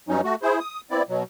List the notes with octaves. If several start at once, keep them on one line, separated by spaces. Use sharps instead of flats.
G2 F#3 C#4 D#4
A3 F#4
E4 G#4 C5
D#6
B3 C4 E4 D5
B2 F#3